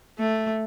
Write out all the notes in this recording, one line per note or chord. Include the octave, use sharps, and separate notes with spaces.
A3